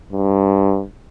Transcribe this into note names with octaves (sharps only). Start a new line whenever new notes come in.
G2